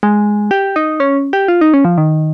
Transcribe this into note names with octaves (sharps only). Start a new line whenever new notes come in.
G#3
G4
D#4
C#4
G4
F4
D#4
C#4
F3
D#3